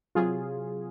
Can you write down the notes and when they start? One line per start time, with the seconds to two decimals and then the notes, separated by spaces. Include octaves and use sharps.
0.15 C3 F#3 F4 G#4